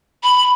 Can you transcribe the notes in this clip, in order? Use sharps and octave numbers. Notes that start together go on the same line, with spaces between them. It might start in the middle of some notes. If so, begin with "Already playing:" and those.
B5